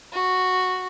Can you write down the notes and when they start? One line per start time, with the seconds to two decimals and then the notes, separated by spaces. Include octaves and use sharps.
0.12 F#4